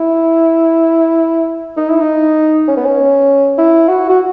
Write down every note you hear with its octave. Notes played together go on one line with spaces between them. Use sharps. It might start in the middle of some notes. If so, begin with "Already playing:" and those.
Already playing: E4
D#4
E4
D#4
C#4
B3
C#4
E4
F#4
F#4